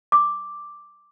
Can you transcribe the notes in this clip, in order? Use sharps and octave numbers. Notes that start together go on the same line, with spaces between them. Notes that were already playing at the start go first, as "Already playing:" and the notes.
D6